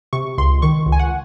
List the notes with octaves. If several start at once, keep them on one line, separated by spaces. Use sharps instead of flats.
C3 C#6
C#2 C6
D#3 C#6
C#2
G#5
F#5